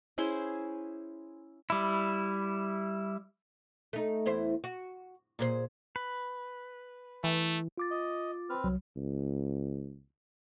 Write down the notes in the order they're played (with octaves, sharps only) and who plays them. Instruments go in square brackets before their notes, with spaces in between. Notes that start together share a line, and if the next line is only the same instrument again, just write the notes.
[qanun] C#4 E4 G#4 C5
[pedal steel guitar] G3 E4
[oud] A3 D#4
E2 E4 C5
F#4
A#2 G#4 C5
[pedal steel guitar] B4
[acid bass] E3 [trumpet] A3
[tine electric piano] F4 D6 A6
[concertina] D#5
C4 B4 F6
[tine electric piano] C2 F#3
[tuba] C#2